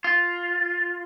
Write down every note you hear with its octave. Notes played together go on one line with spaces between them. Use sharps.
F4